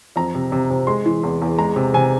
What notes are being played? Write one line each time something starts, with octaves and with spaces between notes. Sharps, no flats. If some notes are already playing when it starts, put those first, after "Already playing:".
F2 A#5
C3
C3
C3
G#3 C6
E3
E2
E2
G#3 A#5
C3
C3 G#5